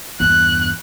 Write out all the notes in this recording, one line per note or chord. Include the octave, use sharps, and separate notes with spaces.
E2 G2 F#6